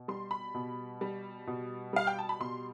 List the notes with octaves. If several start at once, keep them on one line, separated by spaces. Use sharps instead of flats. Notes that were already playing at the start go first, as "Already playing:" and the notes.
Already playing: B2
G3 C6
B5
B2
G3
B2
G3 F5
G5
A5
B5
B2 C6